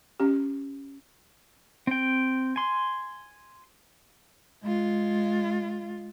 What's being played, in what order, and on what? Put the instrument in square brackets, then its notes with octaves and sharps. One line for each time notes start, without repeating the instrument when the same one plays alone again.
[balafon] C#4 G4
[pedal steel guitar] C4 G5
G#5 C6
[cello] G#3 F4